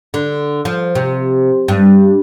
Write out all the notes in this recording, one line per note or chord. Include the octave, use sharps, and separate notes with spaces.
D3
F3
C3
G2